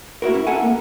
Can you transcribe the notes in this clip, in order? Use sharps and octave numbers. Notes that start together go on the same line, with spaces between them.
A#3 E4 F#4 A#4
C#4 E4
A4 E5 F#5 G#5 A#5
A#3